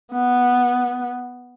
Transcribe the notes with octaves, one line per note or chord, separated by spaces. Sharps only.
B3